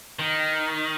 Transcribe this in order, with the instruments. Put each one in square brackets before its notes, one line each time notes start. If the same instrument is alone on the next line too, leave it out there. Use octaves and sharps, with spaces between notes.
[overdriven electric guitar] D#3